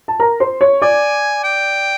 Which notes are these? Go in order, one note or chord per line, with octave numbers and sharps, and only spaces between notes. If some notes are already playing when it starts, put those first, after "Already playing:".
A5
A#4 A#5
C5 C6
C#5 C#6
D5 G#5 D6
G5